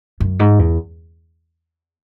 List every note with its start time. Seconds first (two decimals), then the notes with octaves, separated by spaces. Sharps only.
0.20 F#2
0.39 G#2
0.59 E2